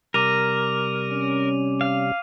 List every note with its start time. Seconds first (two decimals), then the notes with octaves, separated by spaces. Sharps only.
0.14 C3 G3 A#4 D6 D#7 F7
1.12 C#4
1.81 F5